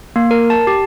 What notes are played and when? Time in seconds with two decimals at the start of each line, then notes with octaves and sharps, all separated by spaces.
0.16 A#3
0.31 A#4
0.50 A5
0.67 G4